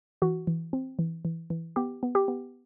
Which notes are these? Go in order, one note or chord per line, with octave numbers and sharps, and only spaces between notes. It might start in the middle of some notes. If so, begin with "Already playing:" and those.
E3 F#4
E3
C4
E3
E3
E3
B3 G4
B3
G4
B3